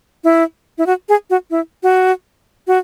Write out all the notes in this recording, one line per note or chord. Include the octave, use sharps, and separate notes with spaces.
E4
E4
F#4
G#4
F#4
E4
F#4
F#4